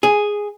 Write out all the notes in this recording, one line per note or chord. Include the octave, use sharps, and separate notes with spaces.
G#4